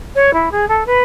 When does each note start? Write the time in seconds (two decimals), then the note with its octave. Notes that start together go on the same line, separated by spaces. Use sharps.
0.15 C#5
0.33 E4
0.51 G#4
0.68 A4
0.86 B4